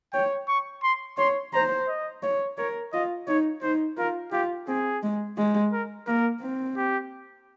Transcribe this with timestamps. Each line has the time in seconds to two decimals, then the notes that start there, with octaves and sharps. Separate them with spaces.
0.13 C#5 G5
0.48 C#6
0.83 C6
1.18 C#5 C6
1.53 C5 A#5
1.88 D#5
2.23 C#5
2.58 A#4 C#5
2.93 F4 D#5
3.28 D#4 C#5
3.62 D#4 C5
3.97 F4 A#4
4.32 F4 G4
4.67 C4 G#4
5.03 G#3
5.38 G#3
5.73 A#4
6.07 A#3 A#4
6.42 C4
6.77 G4